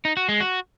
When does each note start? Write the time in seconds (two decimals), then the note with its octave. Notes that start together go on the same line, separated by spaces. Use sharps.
0.05 D#4
0.17 F#4
0.29 G#3
0.40 F#4